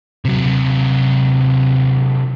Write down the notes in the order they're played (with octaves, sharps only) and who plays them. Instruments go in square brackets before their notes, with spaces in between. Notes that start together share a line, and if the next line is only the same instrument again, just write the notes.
[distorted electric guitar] C3 F#3